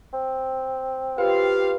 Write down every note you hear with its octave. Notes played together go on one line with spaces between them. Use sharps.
C4
F4 G4 B4 F5